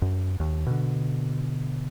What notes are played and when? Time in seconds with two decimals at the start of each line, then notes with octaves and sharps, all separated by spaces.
0.02 F#2
0.40 D#2
0.66 B2 D3